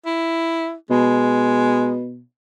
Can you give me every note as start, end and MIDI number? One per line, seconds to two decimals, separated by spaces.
0.06 0.74 64
0.90 2.21 47
0.90 1.97 56